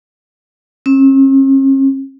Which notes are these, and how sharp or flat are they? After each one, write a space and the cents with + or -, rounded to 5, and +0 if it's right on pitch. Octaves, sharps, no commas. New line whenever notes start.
C#4 -45